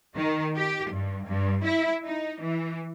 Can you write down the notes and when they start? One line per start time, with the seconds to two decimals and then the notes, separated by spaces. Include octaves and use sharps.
0.16 D#3
0.56 G4
0.91 G2
1.26 G2
1.65 E4
2.05 D#4
2.40 E3